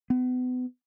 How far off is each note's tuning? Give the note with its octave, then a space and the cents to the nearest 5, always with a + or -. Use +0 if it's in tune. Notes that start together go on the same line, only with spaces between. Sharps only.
B3 +30